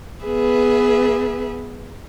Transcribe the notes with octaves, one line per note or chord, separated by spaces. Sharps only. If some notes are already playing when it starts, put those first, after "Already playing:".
B3 G#4 B4 E5